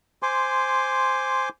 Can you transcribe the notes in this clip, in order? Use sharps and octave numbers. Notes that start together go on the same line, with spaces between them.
C5 G#5 C6 D6